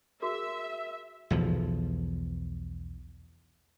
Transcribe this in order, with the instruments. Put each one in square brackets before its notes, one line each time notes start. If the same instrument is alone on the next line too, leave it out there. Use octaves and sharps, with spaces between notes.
[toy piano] F#4 G#4 A#4 [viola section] E5
[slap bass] B1 E2 F3